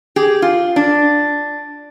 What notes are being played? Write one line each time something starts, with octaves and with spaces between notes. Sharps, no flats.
G4 G#4
F4
D4